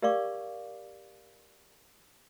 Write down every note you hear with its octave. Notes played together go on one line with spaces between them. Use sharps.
G4 A#4 D5 F5 C#6 D6